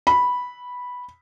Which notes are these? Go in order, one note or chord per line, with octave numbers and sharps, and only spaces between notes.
B5